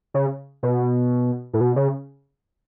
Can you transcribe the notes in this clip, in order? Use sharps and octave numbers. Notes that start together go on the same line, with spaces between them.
C#3
B2
A2
B2
C#3